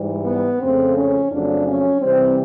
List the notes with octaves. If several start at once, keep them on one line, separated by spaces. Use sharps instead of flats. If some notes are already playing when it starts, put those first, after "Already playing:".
Already playing: G#2 E3 G3
B3
F2 C#3 F3 A3 C4
C#4
F2 C#3 F#3 A3 D4
C#4
C3 E3 G3 C4